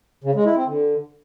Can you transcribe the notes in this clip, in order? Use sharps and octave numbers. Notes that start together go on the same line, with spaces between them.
C#3
G#3
E4
C4
D3